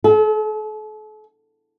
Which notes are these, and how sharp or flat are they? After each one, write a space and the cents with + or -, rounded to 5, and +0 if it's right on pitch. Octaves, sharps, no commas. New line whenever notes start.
A4 -40